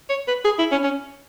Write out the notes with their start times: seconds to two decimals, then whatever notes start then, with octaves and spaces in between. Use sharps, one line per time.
0.09 C#5
0.28 B4
0.45 G#4
0.58 E4
0.71 C#4
0.84 C#4